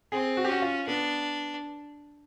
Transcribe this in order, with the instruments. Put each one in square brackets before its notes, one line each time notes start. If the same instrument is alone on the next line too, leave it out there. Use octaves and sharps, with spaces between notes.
[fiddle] C4 [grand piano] G#4
[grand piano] F#4
G4
[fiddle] C#4 [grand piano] F#4
[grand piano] F4
[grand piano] B3 [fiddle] D4